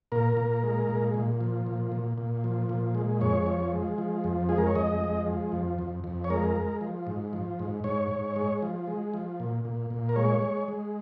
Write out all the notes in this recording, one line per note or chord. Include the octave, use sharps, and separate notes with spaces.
A#2 A#4
A#2
G#3
A#2
A#2
F3
A#2
A#2
A#2
F3
A#2
G#3
F2 C#5
F3
G#3
F3
F2
G#3 G#4
A#4
C#5
F2 D#5
G#3
F3
F2
F2
F2
C#5
G#3 A#4
G#3
F3
G#2
F3
G#2
G#2 C#5
G#2
G#3
F3
G#3
F3
A#2
A#2
A#2
A#4
G#3 C#5
G#3
G#3